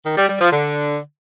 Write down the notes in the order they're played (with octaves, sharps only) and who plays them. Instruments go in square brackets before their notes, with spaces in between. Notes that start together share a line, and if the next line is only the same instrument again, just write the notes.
[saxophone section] D#3
G3
G3
F3
D3